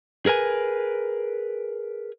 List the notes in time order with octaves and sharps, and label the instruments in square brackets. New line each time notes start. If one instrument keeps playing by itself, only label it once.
[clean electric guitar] G#4 A#4 B4 G#5